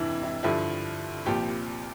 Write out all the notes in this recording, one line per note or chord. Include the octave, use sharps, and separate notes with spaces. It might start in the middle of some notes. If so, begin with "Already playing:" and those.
Already playing: F2 C3 E3 D4 E4
E4
G2 D3 F3 E4
C2 A#2 F3 G4